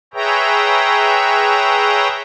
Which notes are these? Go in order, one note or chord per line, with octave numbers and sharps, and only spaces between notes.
G#4 B4 C#5 E5 G5 A#5